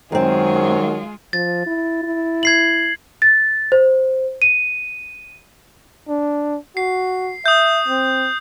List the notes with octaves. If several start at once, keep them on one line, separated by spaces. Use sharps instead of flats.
F#2 D#3 F#3 G#3 C4 F4 G#4
F3 A6
E4
E4
G#6 C7 F#7
A6
C5
D#7
D4
F#4 C7
E5 D#6 G6
C4